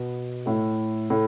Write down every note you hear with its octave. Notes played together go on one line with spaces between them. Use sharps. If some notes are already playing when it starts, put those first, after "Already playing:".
Already playing: B2 B3
A2 A3
A2 A3